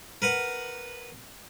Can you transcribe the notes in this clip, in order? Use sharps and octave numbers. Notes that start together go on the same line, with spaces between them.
A#4 B4 F#5